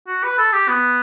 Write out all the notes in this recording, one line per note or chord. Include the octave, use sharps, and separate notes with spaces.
F#4
B4
A4
G4
B3